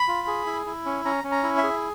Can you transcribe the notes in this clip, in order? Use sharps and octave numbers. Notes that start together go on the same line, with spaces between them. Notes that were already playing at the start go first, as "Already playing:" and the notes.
Already playing: B5
F4
G#4
E4
E4
C#4
C#4 A#5
C#4
A#5
E4
E5
G#4